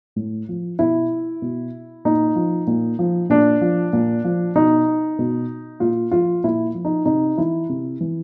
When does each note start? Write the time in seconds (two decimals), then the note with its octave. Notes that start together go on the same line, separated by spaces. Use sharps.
0.16 A2
0.49 F3
0.79 B2 E4
1.42 B2
2.05 A#2 D#4
2.36 F3
2.67 A#2
2.99 F3
3.29 A#2 D4
3.61 F3
3.93 A#2
4.25 F3
4.55 B2 D#4
5.19 B2
5.80 A#2 F4
6.11 F3 F4
6.44 A#2 E4
6.75 F3
6.85 D#4
7.05 C3 D#4
7.38 E3 E4
7.69 C3
8.01 E3